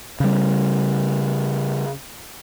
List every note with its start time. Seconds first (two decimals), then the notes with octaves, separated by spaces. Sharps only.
0.20 C#3 G3